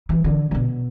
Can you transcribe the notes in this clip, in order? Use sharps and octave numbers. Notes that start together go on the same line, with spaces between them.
E3
D3
D3
B2